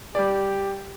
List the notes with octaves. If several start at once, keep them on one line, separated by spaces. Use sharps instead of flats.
G3 G4 D5